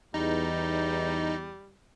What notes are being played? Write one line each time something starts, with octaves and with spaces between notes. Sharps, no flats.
E2 G3 D#4